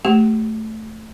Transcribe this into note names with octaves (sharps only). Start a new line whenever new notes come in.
A3 G4